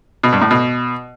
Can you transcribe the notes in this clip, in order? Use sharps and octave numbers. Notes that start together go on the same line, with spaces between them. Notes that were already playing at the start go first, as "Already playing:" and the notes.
B2
G2
A2
B2